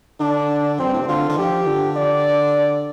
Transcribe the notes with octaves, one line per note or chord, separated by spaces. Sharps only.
D3 D4
F2 C4
G2
A2
C3
D3 F4
D3
F3 G4
D3
D5